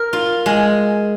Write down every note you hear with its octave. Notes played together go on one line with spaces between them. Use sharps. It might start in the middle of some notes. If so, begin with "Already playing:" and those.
Already playing: A#4
F4
G#3